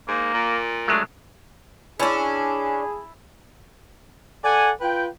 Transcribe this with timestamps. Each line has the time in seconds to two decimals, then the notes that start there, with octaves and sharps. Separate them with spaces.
0.08 G#2 A#3
0.34 A#2
0.88 F#3 G#3 A3 D4
2.00 C#4 D4 E4 G#4 A5 E6
4.43 A4 D5 F#5 G#5
4.80 F4 B4 G5